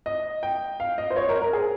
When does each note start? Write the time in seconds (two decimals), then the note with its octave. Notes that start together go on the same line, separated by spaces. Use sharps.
0.06 D#5
0.43 G5
0.80 F5
0.98 D#5
1.11 C5
1.17 C#5
1.29 A#4
1.42 A#4
1.53 G#4